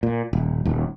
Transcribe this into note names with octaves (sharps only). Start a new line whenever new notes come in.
A#2
D#1
D#1 D#2